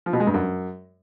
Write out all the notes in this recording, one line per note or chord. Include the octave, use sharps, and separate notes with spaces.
F3
B2
G#3
G2
F#2